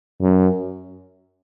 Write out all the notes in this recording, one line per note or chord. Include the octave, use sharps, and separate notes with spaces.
F#2